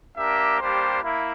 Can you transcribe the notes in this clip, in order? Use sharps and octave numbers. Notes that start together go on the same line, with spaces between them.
A#3 D4 G4 A#4 E5
G3 A#3 D4 G4 C5
A#3 E4